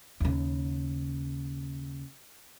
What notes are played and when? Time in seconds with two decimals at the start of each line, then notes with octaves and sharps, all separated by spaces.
0.20 D#2 C#3